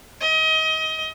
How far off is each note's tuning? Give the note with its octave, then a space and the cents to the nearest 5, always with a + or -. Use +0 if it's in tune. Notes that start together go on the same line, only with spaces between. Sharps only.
D#5 +30